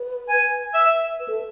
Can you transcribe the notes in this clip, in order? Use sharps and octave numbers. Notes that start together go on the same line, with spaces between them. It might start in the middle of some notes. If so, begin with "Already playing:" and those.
Already playing: B4
G#5
E5
B4
A4